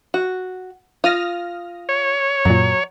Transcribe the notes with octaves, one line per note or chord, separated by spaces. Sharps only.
F#4
F4 D#6 F6 A#6
C#5
F#2 A#2 F#3